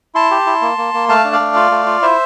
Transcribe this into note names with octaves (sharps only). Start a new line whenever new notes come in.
E4 A5 C6
G4
E4
A#3
A#3
A#3
A3 F5 A5
D4
D5 F5
A3
F4
A3
F4
E4 C5 E5